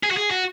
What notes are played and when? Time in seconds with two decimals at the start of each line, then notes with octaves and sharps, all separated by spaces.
0.04 G#4
0.11 F#4
0.17 G#4
0.31 F#4